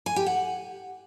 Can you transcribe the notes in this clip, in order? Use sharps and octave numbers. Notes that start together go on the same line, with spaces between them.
G#5
G4
F#5